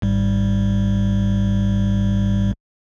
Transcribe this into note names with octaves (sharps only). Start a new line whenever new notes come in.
G#1 G#2 G3